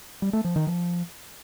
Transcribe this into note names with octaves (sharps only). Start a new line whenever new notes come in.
G3
A3
F3
D#3
F3